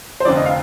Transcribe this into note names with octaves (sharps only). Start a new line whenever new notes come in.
C5
F1 F2 D3 F3 D5
D#5
F5